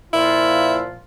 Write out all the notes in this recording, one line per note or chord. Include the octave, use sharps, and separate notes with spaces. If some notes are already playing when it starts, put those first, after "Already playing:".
A#2 F3 E4 F4